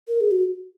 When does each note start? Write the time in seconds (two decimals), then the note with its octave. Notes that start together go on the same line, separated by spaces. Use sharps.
0.08 A#4
0.21 G#4
0.31 F#4